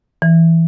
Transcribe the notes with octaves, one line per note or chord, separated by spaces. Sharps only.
E3